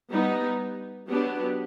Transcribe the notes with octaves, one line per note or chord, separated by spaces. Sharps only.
G3 B3 D#4
F#3 B3 D4 G4